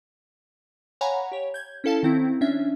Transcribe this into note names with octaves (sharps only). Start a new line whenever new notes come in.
C#5 F5 F#5 G#5 A#5 B5
G4 C#5
G6 G#6
C#4 E4 A4 F5 A5
D#3 C4 E4
C#4 D4 E5